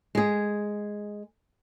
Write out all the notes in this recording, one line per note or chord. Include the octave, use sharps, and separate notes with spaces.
G#3 G#4